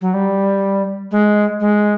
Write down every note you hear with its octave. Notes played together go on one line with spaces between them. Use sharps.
F#3
G3
G#3
G#3